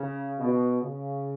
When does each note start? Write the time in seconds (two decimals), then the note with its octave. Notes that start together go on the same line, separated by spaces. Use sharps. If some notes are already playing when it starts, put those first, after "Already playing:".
Already playing: C#3
0.39 B2
0.80 C#3